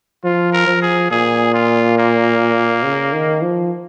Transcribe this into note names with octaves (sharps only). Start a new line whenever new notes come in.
F3 F4
A#4
F3
G#4
A#2 G#4
F4
A#3
C#3
D#3
F3